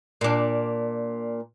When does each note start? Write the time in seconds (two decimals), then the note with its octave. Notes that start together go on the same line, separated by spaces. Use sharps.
0.21 A#2 D4